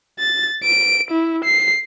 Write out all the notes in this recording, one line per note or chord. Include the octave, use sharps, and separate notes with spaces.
A6
D7
E4
C7